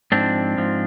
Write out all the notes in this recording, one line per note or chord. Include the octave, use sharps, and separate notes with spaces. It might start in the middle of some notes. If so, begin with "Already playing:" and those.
G#2 F3 C4 D4
G#2 F3